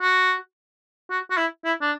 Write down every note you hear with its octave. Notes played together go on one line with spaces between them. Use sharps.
F#4
F#4
F#4
E4
E4
D4